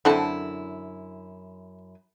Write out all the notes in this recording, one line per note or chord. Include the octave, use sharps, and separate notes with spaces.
F#2 D3 C4 E4 A4